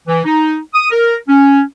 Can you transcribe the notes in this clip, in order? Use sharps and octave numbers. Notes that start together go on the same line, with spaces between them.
E3
D#4
D#6
A#4
C#4